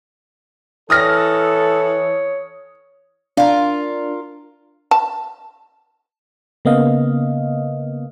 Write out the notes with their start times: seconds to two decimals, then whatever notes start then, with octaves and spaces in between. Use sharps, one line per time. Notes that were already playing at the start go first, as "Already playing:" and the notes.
0.90 E3 A4 C#5 D#6 F6 A#6
3.37 D4 F4 A#4
4.91 A5
6.65 C#3 A#3 B3 D#5 F5